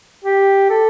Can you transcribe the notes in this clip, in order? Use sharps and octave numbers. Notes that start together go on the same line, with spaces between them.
G4
A4